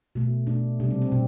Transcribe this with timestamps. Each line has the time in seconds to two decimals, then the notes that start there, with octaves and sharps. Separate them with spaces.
0.15 B2 A3
0.47 B2 A3 D4
0.80 C3 D4
0.84 G3
0.91 C4
1.02 C4
1.12 B2 D4